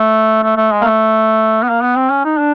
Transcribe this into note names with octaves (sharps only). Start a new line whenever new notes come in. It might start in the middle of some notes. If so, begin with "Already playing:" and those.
Already playing: A3
A3
A3
G#3
A#3
A3
B3
A#3
B3
C4
C#4
D#4
D4